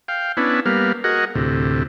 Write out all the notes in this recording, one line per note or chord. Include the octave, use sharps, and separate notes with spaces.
F5 G5
B3 C#4 D4 E4
G3 A#3 B3 F5
F#4 G#4 A#4 D#5 F#5
D2 A2 C3